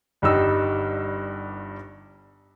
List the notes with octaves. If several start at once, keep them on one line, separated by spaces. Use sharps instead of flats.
G1 G2 G3 D#4 E6